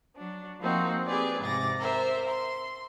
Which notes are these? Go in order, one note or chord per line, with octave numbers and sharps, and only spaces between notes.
F#3 D4
F3 A#3 C4 D#4 F#4
C4 G4 G#4 B4 D5
G#2 C3 D6 A6 A#6
A#4 C5 E5
C6